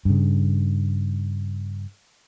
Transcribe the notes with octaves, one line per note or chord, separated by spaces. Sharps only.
G2 C#3